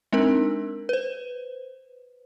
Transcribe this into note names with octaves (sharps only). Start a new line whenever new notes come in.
G#3 C4 D4 D#4 A#4
B4 C5